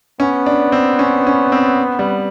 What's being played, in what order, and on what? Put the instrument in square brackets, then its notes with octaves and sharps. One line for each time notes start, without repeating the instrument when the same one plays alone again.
[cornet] B3 [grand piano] C#4
[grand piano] D4
C4
C#4
C#4
C4
G3